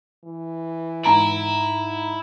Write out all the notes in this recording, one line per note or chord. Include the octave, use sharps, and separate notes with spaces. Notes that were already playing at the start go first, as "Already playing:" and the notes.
E3
G#2 E4 A#5 D7